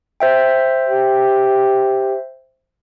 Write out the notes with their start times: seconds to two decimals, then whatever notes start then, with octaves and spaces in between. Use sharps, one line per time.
0.20 C5 E5 G5
0.89 G4